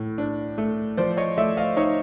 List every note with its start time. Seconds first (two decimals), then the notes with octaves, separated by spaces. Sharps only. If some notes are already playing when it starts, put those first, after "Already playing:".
Already playing: A2
0.18 D4
0.58 A3
0.97 F3 C5 D5
1.17 C#5 D#5
1.37 A3 D5 E5
1.57 D#5 F5
1.77 D#4 C#5